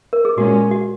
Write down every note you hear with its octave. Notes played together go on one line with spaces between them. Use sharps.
A#4
G#4
A#2 G#3 C#4 F#4
F#4